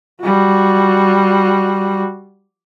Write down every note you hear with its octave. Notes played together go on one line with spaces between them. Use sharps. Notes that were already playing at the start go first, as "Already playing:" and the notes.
G3 F#4